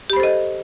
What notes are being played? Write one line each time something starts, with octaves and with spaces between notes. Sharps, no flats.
G4 A4 C5 D#5 B5